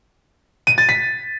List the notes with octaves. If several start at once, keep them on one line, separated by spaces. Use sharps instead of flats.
D#7
A6
B6